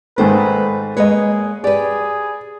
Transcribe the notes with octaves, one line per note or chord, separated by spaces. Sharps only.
G#2 D#3 A3 B4 C5
G#3 A#3 G#4 B4 C#5 D#5
G4 G#4 B4 D5